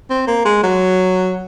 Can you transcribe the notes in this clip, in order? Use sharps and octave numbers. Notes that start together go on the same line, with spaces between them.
C4
A#3
G#3
F#3